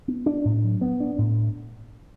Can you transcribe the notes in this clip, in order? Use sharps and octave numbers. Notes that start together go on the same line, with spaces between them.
B3
D4
A2
F#3
B3
D4
A2